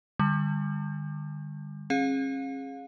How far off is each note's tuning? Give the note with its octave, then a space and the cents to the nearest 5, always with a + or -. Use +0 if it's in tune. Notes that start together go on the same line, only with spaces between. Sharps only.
D3 +35 G3 +30
C#4 -45 G#4 +0 F5 +30